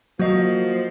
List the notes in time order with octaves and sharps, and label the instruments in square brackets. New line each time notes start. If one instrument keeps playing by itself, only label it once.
[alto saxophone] F3 [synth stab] F#3 [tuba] A#3 [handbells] F#4 D#5